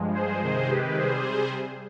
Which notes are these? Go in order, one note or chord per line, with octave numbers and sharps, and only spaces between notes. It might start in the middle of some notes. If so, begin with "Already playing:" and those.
Already playing: G2 F3 G#3
G#4 C5
C3 D#3 G#3 G#4 C5
G4 B4
C3 G3 G#4 C5